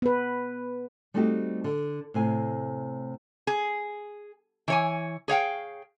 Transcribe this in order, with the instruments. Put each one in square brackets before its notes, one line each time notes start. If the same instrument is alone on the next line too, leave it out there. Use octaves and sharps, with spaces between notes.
[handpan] B3 B4
[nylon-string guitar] G3 A3 C4 D#4 F#4 G4
D3
A2 C3 G#5
[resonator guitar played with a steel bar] G#4
E3 C#5 G#5
G#4 C#5 F5 G5